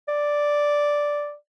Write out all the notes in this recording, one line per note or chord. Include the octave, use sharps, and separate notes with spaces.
D5